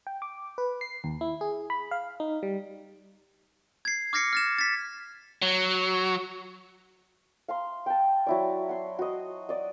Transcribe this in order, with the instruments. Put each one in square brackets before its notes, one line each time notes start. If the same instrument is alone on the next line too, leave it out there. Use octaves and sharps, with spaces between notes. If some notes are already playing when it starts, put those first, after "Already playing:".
[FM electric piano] G5
D6
B4
C7
D#2
E4
G#4
B5
F5
D#4
G3
[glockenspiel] G#6 C7
D6 F6 G#6 A#6 C7 C#7
F6 A6 E7
A6 B6
[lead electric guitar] F#3
[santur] F5 A#5 C6
G5 A5
F#3 E4 D5
F#5 C6
F#4 D#5
D5 D#5